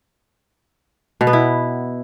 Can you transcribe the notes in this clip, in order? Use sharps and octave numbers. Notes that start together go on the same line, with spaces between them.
B2
B3
E4